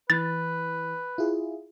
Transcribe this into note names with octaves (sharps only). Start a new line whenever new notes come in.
E3 B4 A6
E4 F4 G#4